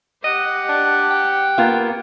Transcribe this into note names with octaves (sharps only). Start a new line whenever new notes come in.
G4 D#5 F#5
D4
G5
A#3 B3 F4